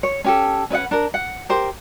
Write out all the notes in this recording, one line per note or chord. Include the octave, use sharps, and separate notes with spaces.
C#5
C#4 G4 A4
C#4 B4 D#5 F#5
D4 A#4
F#5
G4 A#4 C5